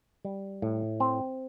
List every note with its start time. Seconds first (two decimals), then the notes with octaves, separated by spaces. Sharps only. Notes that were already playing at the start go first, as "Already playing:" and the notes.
0.25 G3
0.62 A2
1.00 C4